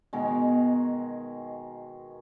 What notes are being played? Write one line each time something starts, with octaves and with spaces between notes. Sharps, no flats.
B2 D#3 G#3